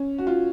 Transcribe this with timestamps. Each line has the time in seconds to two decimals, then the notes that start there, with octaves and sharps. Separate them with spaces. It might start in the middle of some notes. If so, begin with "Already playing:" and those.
Already playing: C#4
0.18 F#4
0.27 F4